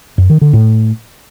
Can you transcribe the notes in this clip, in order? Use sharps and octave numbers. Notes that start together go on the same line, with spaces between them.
F#2
D#3
D3
A2